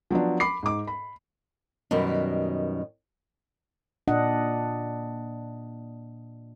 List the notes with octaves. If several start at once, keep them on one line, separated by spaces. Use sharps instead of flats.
F3 F#3 B3 D4
B5 D6 C7
G#2 D6
B5
F#2 B2 D#3 G3
A#2 D4 D#5 F#5